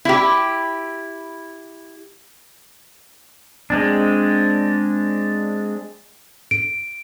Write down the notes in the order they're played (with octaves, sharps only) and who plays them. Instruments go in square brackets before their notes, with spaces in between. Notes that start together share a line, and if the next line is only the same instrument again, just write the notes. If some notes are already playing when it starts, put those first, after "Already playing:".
[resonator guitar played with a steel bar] E4 G4
[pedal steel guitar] G#3 C4 D4
[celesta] D7